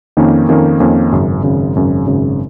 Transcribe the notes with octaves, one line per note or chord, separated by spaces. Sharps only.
F2 D#3 A#3 C#4
F2 D#3 A#3 C#4
F2 D#3 A#3 C#4
G#1 F#2 C#3
G#1 F#2 C#3
G#1 F#2 C#3
G#1 F#2 C#3